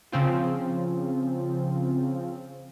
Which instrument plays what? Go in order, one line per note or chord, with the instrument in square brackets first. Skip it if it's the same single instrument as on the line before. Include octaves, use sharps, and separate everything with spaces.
[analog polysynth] C#3 F3 C4 F4